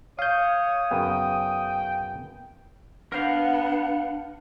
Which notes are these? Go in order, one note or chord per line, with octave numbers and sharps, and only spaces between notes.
C#5 F5 D#6 G6
F#2 C#3 B3 G5
B3 D4 A#4 C5 F5 F#5